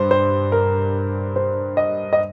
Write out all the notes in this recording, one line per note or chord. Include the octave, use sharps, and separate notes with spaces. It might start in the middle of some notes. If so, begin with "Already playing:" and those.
Already playing: G2 C5
C5
A#4
C5
D#5
D#5